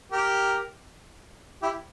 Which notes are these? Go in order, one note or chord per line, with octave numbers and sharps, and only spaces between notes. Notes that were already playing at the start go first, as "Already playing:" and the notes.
G4 A#4
E4 G4